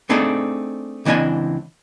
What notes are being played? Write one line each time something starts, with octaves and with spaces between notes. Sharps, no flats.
A3 C4 D4 D#4 G#4 A4
C#2 E3 C4 D4 D#5 G#5